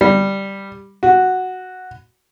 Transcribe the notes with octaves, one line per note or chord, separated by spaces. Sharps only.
G3
F#4